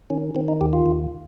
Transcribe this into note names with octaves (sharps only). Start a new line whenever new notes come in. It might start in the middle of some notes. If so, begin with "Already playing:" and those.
D#3 C#4
D#3 C4
D#4
D#2 G4
F4
D#2